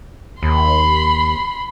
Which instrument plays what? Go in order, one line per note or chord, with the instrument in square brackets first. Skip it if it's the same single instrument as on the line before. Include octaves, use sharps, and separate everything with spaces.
[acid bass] D#2 [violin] B5 C6